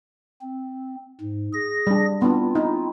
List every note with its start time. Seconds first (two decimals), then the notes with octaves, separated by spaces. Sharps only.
0.42 C4
1.21 G#2
1.53 G#4 A#6
1.87 G3 D4
2.22 B3 C4 D4 E4 F4
2.55 D#4